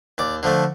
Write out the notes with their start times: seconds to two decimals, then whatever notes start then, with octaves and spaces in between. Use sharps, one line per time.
0.18 D#2 D5
0.43 D3 F3 A3